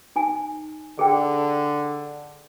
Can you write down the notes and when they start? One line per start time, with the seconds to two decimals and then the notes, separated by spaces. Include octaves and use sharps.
0.16 D#4 G#5
0.99 D3 G#4 G5